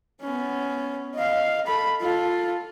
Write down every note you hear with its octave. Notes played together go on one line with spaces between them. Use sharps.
B3 C#4
D#5 F5
A4 B5
F4 A4